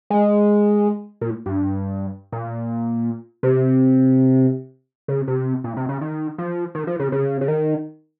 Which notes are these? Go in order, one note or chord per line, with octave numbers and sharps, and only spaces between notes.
G#3
A#2
G2
A#2
C3
C#3
C3
A#2
C3
C#3
D#3
F3
D#3
F3
C#3
C#3
C#3
D#3